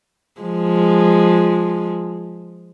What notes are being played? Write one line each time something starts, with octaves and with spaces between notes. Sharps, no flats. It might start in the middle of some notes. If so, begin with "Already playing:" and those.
F3 G#3